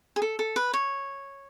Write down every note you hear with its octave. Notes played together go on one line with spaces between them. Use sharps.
G#4
A4
A4
B4
C#5